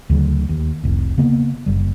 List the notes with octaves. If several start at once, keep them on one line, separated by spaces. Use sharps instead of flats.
D2 C#3 F#3
D#2
F1 C2
C#3 A#3 B3
F#1 G3